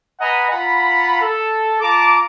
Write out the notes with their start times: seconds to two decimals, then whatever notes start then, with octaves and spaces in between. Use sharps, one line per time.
0.20 B4 D#5 F#5 G#5 A#5 B5
0.51 F4 F#5 A#5 B5
1.21 A4
1.81 F4 A5 A#5 D6